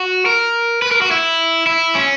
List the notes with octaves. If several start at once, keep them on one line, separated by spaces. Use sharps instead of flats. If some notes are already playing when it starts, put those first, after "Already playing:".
Already playing: F#4
A#4
B4
A#4
F#4
E4
E4
C#4